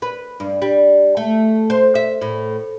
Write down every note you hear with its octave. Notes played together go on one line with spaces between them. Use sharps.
B4
G2
G3
A3
C5
E5
A2